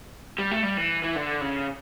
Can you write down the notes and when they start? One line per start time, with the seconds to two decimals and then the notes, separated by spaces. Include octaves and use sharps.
0.38 G3
0.51 A3
0.63 G3
0.77 E3
1.03 E3
1.16 D3
1.41 C#3